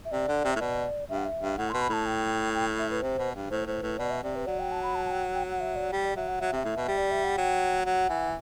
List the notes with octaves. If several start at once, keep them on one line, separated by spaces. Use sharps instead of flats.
E5
C3 D5
D3
C3
A2 E5
B2 D5
G2 E5
F#5
E5
G2
A2 F#5
B2 C6
B5
A2 A5
G5
G5
E5
B4
C3 C5
B2
G2
A2 C5
A2 C5
A2 B4
B2 D5
E5
C3 D5
B4
F#3 D5
G5
A5
B5
A5
A5
G5
G5
F#5
E5
D5
G3
D5
F#3 E5
F#5
F#3 E5
C3
A2
B2
G3
D5
E5
F#5
F#3 G5
F#3 F#5
E3